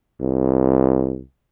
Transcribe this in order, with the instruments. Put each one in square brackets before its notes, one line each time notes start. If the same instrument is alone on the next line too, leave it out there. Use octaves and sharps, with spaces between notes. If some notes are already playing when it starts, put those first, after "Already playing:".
[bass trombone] C2